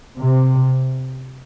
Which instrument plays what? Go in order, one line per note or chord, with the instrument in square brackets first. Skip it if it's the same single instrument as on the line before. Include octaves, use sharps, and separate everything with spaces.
[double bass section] C3